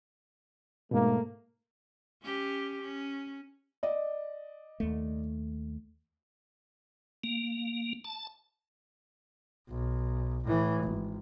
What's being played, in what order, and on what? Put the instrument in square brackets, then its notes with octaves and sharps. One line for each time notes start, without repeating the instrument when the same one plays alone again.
[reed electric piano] G#2 B2 [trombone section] A3 A#3
[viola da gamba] C#4 G4
C#4
[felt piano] D5 D#5
[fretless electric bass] D#2 A3
[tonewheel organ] A#3
A5
[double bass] B1
A2 E3
G#1